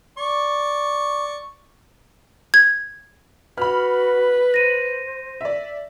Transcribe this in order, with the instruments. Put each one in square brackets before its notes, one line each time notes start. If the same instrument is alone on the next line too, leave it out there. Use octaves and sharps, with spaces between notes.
[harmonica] D5 C#6
[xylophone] G#6
[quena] F#4 [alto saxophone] B4 [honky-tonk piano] B5 F6
[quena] C5 [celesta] A#6 D#7
[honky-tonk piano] D5 E5